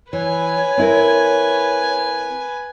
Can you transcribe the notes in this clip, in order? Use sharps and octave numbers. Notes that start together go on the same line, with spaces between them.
E3 B4 C#5 G#5
C4 E4 A#4